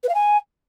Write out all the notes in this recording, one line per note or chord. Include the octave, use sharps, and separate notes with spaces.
B4
F5
G#5